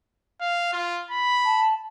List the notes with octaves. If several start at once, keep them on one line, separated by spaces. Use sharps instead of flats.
F5
F4
B5
A5